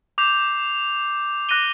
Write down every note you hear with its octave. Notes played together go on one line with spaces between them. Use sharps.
D6 G6 C7 F7
D6 F#6 A#6 D#7 G7